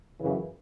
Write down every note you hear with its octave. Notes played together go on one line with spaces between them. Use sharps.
F#2 C#3 E3